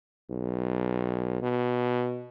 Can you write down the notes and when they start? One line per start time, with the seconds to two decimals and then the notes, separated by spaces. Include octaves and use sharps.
0.30 B1
1.42 B2